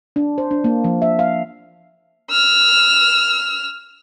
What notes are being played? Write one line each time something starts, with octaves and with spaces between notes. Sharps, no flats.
D4
C5
D4
A#3
F3
E5
F5
E6 F6